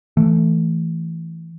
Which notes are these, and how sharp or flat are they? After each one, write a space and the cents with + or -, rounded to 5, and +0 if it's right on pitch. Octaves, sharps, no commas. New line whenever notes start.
E3 +0 A3 +10